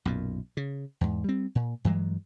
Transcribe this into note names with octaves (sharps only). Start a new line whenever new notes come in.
B1 F#2 A#2
C#3
E2 G#2
G3 C4
A#2
G2 E3 F#3 G#3